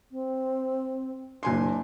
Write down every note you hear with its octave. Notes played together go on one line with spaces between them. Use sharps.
C4
F#1 D4 G#5 C6